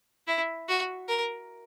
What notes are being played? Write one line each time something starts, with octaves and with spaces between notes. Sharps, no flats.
E4
F#4
A#4